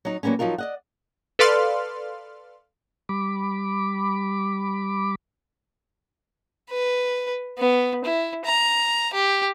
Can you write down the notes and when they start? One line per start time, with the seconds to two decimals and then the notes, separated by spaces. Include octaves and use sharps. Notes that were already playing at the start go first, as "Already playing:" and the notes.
0.05 F#3 D#4
0.23 F#3 G3 A#3 B3 C#4
0.39 F3 F#3 D#4 F4 A#4
0.58 D5 D#5 F#5
1.39 A4 B4 D5 F5 C6 F6
3.09 G3 B5 D6
6.71 B4
7.59 B3
8.05 E4
8.45 A#5
9.14 G4